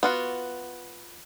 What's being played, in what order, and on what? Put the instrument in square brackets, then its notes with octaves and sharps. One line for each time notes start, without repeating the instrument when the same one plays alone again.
[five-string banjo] B3 F4 F#4